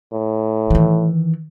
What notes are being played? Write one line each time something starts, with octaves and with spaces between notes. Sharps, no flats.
A2
D#3 E3